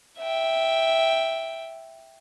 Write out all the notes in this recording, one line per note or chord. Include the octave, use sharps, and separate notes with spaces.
E5 G5